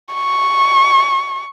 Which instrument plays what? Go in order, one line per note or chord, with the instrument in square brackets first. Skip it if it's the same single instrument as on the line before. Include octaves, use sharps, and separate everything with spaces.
[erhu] C#6